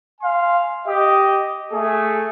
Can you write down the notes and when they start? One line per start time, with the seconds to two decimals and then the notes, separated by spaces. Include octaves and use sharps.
0.21 F5 G#5 C6
0.86 G4 D#5
1.72 A3 G#4